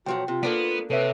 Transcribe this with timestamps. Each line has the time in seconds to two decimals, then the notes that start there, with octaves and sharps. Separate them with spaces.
0.06 B1 F3 F#3 F#4 G5
0.28 C3 F4
0.43 A#3 B3 D4 A4 D5 B6
0.90 C3 A4 B4 C#5 E5